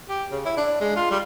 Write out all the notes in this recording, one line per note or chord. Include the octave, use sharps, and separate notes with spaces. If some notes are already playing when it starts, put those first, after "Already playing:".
G4
C#3
E4
D4
G#3
F4
G3